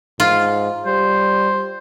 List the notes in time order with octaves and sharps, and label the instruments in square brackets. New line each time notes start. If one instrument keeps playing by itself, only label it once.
[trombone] G#2 [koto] F4
[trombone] G3 [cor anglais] C5